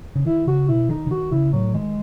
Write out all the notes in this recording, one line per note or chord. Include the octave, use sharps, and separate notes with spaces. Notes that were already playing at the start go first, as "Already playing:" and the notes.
C#3
D#3 E4
C#3 F#4
B2 E4
D#3 D#4
C#3
D#3 F#4
C#3 E4
A2 F#3
D#3 G#3